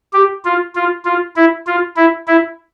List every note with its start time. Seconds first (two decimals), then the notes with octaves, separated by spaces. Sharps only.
0.13 G4
0.45 F4
0.75 F4
1.05 F4
1.36 E4
1.67 F4
1.96 E4
2.27 E4